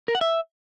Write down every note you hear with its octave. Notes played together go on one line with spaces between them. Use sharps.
A#4
F#5
E5